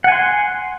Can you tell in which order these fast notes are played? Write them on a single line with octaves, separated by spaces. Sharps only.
F#5 G#5 C6